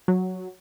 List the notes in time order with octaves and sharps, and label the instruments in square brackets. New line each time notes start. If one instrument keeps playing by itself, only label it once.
[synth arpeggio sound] F#3